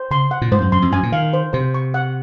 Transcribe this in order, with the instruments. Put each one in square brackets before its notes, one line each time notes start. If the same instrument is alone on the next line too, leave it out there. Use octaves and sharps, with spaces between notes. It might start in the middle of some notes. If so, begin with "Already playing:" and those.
Already playing: [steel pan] C5
[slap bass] C#3 [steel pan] C6
[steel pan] F#5
[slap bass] A#2
[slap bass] G#2 [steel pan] C5
[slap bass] F#2
[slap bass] F#2 [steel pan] C6
[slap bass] F2
[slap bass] F#2 [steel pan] G#5
[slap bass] A#2
[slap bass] D#3 [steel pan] F5
[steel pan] C5
[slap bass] C3 [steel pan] C5
[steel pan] C#6
F#5